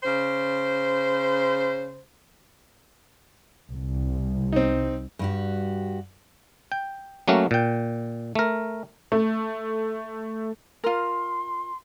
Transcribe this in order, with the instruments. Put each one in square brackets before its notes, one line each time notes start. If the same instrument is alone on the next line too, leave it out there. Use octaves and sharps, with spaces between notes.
[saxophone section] C#3 C5
[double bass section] C2
[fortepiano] C4 D#4
[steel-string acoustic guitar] G2 F#4 G4
[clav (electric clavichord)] G5
F#3 A3 A#3 C#4 F#4
A#2 G5
A3 A#4
[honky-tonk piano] A3
[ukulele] F4 A#4 [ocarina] C6